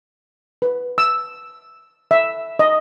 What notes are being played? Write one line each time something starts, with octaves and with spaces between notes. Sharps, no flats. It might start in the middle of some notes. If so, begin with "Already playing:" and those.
B4
E6
E5
D#5